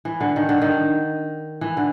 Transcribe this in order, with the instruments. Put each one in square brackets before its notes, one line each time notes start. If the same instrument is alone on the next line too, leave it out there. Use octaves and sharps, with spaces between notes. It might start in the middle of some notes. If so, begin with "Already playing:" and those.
[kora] E3
D3
D#3
D3
D#3
E3
D3